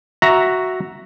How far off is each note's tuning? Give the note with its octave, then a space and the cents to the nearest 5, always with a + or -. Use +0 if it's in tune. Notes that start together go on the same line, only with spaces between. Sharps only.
F#4 +0 E5 +0 A#5 +0